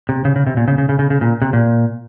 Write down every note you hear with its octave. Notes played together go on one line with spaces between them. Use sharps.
C3
C#3
C#3
C3
A#2
C#3
C#3
C#3
C#3
C#3
A#2
C3
A#2